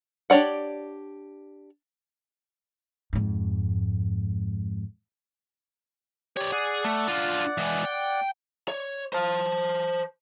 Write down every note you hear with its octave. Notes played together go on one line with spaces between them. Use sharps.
D4 G4 C#5 D5 F#5
F2 G#2
G4 C#5 D5
G#4 D5 F#5
A3
D3 F4
E3 G#3
G5
C#5
C5 A5